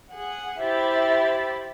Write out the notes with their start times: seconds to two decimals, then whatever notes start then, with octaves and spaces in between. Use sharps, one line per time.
0.12 G#4 F#5
0.62 E4 G4 C5 E5 B5 A6